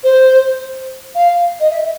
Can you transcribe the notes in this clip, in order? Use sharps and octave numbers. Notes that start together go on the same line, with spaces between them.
C5
F5
D#5
E5